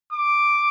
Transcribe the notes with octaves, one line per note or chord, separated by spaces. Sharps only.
D6